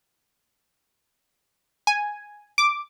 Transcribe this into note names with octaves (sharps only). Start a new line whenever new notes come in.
G#5
D6